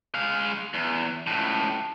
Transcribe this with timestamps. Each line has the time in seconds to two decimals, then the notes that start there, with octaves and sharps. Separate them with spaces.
0.15 G#3 F5
0.74 E2
1.27 C#2 A2